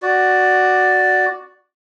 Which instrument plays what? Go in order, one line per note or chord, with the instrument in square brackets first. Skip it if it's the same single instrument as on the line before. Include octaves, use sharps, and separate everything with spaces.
[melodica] F#4 D5